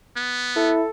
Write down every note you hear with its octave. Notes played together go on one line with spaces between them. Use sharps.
B3
E4 A4